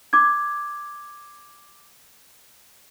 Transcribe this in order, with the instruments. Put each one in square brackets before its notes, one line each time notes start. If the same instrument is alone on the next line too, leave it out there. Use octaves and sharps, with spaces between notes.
[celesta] D6 G#6